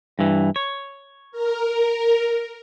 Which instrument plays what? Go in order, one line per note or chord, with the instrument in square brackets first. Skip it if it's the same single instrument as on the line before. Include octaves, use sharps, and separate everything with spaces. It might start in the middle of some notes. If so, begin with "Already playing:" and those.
[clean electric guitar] G2 E3
C#5
[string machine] A#4